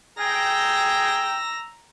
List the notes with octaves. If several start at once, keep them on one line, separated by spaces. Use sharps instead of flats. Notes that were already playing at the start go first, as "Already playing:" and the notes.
G#4 G5 A#5 E6 A#6